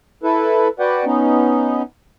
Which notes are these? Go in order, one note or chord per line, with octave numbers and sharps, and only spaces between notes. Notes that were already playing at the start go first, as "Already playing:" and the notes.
E4 A4 B4
F#4 B4 D5 F#5 G5
B3 C#4 D#4